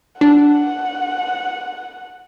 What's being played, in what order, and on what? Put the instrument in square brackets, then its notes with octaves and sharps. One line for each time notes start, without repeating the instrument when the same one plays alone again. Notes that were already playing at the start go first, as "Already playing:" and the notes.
[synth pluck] D4 [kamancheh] F#5